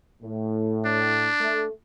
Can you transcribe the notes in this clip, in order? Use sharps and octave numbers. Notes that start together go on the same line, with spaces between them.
A2
D4
A3